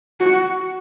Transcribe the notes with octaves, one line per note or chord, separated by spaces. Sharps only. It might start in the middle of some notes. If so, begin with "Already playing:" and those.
F#4